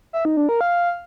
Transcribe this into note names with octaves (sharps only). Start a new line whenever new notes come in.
E5
D#4
D4
A#4
F5